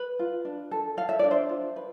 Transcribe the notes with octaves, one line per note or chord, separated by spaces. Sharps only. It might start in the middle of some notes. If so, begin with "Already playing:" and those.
Already playing: B4
F4
D4
A4
A4 F5
E5
D4 D5
C5 E5
F4
B4